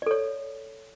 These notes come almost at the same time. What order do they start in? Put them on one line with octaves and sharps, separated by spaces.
D5 A4 C#5